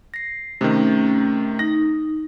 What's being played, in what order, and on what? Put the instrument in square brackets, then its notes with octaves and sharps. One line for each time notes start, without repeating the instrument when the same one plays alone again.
[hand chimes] A#6 C7
[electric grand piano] C3 D#3 [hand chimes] A3 [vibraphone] C#4
[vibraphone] D#4 [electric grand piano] A#6